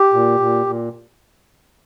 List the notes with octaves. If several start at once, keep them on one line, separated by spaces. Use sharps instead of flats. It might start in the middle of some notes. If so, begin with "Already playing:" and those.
Already playing: G4
A#2
A#2
A#2